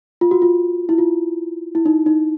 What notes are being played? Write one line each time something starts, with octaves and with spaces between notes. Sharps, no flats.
F4
F#4
F4
E4
F4
E4
D#4
D#4